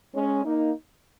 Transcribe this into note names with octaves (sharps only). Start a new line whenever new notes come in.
G#3 C#4
A#3 D#4